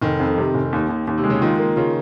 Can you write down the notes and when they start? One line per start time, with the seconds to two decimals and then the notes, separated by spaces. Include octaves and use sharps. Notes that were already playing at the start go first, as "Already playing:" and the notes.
0.02 F1 D#3
0.20 F2
0.38 C3
0.54 F1
0.73 D#2
0.89 D#2
1.07 D#2
1.18 C3
1.24 G#3
1.30 C#3
1.42 D#3 F4
1.59 A#3
1.76 C#3 F4